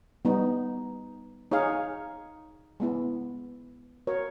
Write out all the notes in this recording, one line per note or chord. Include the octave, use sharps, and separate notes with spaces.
G3 B3 D#4
D#4 G#4 C#5 F5
G#3 B3 E4
F#4 A#4 C#5